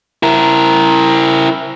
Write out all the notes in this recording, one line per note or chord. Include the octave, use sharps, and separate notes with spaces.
E4 A#4